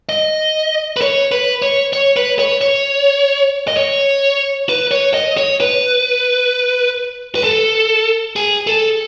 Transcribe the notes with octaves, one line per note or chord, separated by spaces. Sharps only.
D#5
B4
C#5
B4
C#5
C#5
B4
C#5
C#5
D#5
C#5
B4
C#5
D#5
C#5
B4
B4
A4
G#4
A4